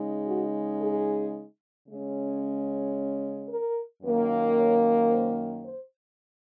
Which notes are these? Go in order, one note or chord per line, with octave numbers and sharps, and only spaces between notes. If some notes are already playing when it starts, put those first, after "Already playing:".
Already playing: C#3 G#3 D#4
F#4
G#4
C#3 G#3 C#4
A#4
F#2 D#3 A#3
C#5
C5
C5